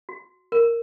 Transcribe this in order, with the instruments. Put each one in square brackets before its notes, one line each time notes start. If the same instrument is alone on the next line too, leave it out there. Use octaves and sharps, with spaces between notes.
[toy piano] F#4
A#4